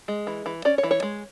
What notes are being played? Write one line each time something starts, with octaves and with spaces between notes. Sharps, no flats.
G#3
E3
E3
C#4 D5
C#5
E3
C#5
G#3